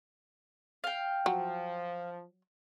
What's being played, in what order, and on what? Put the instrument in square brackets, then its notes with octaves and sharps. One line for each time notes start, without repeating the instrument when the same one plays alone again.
[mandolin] F5 G5
[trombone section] F3 [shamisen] F#3